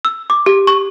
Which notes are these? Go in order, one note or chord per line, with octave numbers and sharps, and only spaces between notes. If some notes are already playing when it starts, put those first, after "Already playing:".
E6
D6
G4
C#6